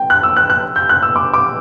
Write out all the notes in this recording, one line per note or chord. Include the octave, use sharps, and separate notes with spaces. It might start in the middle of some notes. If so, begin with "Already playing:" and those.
Already playing: G5
F#6
E6
F#6
F#6
G6
F#6
E6
D6
D6